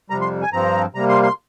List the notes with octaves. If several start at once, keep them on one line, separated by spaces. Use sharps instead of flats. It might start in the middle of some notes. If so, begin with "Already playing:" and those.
F2 C3 G3 A#5
C6
G#5
G2 F3 C4 A#5
C3 G3 A#3 A#5
C6
C6